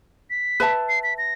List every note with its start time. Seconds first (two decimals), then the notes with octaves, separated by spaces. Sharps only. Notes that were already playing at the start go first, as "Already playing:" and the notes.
0.30 B6
0.60 B4 E5 A5
0.89 C7
1.03 B6
1.18 A#6